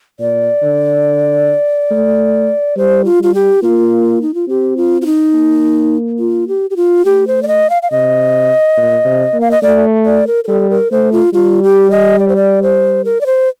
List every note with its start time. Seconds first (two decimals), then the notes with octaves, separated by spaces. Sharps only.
0.19 A#2 D5
0.62 D3
1.91 A3
2.76 G3 C5
3.05 F4
3.20 G3 F4
3.35 G4
3.63 A#3 F4
4.22 D#4
4.34 F4
4.48 C4 G4
4.77 F4
5.02 F4
5.06 D#4
5.33 A#3
6.19 F4
6.48 G4
6.70 G4
6.77 F4
7.05 A3 G4
7.27 C5
7.43 D5
7.48 D#5
7.70 F5
7.82 F5
7.91 C3 D#5
8.77 A#2
9.05 C3
9.34 A#3
9.41 F5
9.51 D#5
9.62 A3 D5
10.06 D5
10.27 A#4
10.44 A#4
10.48 G3 A4
10.70 A#4
10.91 A3 C5
11.12 F4
11.33 G3 F4
11.63 G4
11.91 D#5
12.19 D5
12.29 C5
12.36 D5
12.62 C5
13.05 A#4
13.21 D5
13.26 C5